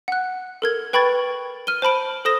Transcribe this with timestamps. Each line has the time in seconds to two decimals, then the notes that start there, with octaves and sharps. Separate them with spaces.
0.08 F#5 F#6
0.62 A4 A#4 G#6
0.93 B4 G5 B5 C#6 G#6 A6
1.67 F6 D#7 G7
1.82 C5 A5 B5 D7
2.25 A4 C5 D#6 A#6 E7 G7